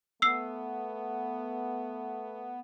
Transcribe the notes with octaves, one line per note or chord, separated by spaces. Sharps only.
A3 B3 E6 C7